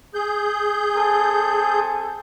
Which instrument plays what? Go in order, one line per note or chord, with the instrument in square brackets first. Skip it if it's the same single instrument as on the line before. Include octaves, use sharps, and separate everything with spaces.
[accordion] G#4 G6
[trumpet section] C4 A4 G#5